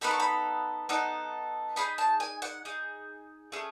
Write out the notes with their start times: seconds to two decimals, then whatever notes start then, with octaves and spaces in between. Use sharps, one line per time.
0.01 B3 D#4 A4 B5
0.11 C#6
0.20 B5
0.89 B3 D#4 A4
1.76 D#4 G#4 B5
1.98 A5
2.20 G#5
2.42 F#5
2.65 D#4 G#4
3.52 A3 C#4 G#4